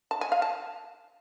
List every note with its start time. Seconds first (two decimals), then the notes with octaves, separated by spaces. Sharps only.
0.11 A5
0.21 G#5
0.32 F5
0.42 A5